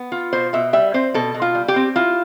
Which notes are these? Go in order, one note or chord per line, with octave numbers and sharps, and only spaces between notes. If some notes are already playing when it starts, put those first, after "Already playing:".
Already playing: B3
F4
B2 C5
B2 E5
G3 E5
C4 C5
B2 A4
B2
F4
G3
G4
C4
E4 F4